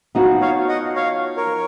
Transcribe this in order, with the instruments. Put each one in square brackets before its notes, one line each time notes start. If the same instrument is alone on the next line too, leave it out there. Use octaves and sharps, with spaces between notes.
[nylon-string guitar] F3 B3 D#4 F#4
[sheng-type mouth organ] C#5 F5
D#5 F#5
C#5 F5
A#4 C#5